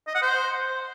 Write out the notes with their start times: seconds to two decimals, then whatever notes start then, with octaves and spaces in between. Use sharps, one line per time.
0.07 D#5
0.15 F#5
0.22 C5